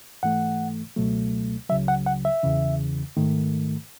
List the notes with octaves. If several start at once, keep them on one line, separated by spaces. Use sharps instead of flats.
G#2 E3 A3 F#5
C#2 B2 F#3 A3
C#2 C#3 F#3 E5
F#5
F#5
E5
E2 C#3 E3
G#2 D#3 A3